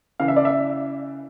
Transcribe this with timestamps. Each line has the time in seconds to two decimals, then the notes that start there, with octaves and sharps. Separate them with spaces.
0.20 C#3 E3 F5
0.28 E5
0.36 D5
0.45 E5